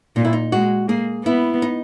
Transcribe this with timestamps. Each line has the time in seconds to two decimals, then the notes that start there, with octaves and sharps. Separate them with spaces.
0.16 A#2 D#4
0.25 E4
0.33 D#4
0.52 G#3 F#4
0.89 A#3 G#4
1.25 B3 E4
1.62 D#4